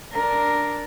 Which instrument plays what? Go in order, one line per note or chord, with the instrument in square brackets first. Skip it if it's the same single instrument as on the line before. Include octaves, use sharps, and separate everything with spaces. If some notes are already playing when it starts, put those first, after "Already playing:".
[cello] D4 A#4